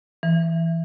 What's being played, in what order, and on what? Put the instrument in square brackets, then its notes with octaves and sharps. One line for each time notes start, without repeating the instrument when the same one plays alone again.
[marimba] E3